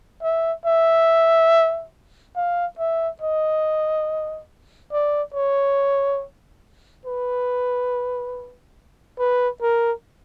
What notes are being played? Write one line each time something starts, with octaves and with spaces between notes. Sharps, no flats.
E5
E5
F5
E5
D#5
D5
C#5
B4
B4
A#4